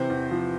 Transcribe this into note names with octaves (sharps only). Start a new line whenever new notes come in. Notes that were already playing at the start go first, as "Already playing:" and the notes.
Already playing: C3 E3 C5
E2
F3